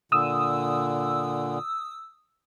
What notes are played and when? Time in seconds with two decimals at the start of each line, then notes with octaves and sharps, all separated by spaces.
0.12 A#2 D3 D#6 E6